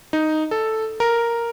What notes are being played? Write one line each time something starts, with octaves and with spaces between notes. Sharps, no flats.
D#4
A4
A#4